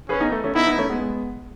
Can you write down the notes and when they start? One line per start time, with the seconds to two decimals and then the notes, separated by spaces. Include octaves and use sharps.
0.09 C#4 G#4 B4
0.21 B3 D#4
0.32 A3
0.44 A3 C#4
0.55 B3 D#4 E4
0.67 B3 D#4
0.78 A3 C#4
0.90 G#3 B3